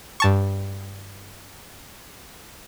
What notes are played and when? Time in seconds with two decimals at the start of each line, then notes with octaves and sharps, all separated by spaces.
0.20 G2 A5 C#6